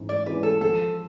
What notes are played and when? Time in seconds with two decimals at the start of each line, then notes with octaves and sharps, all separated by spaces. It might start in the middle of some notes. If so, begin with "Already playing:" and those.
Already playing: G#2 E3 G#3 C#4
0.09 D5
0.26 E3 G#3 C#4 B4
0.43 A4
0.61 F3 A4